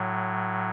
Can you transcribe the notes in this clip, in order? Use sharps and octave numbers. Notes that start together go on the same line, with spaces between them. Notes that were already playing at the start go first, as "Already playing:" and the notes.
Already playing: A2 F#3